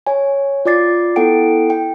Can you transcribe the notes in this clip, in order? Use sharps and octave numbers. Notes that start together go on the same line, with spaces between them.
C#5 G#5
F4 D5 D6 A6 C7
B3 E4 A4 F#5 G5 D7
G5